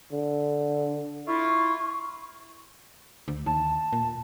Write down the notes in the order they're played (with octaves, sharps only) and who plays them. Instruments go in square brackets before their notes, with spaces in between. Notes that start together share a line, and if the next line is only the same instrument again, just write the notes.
[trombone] D3
[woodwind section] E4 F4 [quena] C#6
[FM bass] D2
[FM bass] D#2 [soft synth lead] A5
[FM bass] A#2